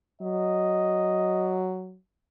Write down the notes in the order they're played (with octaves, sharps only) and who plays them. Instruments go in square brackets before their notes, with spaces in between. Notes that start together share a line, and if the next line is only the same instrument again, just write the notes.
[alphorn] F#3 [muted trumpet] D#5